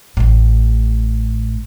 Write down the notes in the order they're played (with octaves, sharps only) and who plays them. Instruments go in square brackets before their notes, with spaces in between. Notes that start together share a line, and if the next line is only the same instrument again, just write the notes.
[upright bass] A1 A2